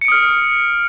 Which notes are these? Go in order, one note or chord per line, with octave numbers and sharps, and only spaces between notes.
D#6 F6 C#7 D7